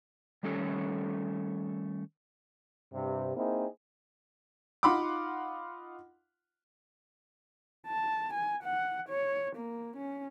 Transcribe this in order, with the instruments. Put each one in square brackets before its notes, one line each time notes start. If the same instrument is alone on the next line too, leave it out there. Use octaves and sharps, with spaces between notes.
[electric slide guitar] D#3 G3 A3 C#4 A4 C#5
[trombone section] G2 C3
A#3 C4 D#4 E4 G#4
[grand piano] D#4 F4 F#5 B5 C6 D6
[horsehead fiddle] A5
G#5
F#5
C#5
A#3
C#4